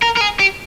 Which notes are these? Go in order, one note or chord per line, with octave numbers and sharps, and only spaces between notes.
A#4
A#4
G#4
G4